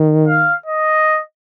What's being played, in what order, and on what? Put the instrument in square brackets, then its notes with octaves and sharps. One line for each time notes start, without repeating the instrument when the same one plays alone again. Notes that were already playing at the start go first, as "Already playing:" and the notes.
Already playing: [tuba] D#3
[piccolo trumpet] F5
D#5